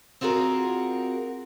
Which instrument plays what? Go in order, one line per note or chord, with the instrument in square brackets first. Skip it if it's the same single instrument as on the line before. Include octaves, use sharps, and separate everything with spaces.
[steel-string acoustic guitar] C4 F4 F#4 G#4 A#4 D5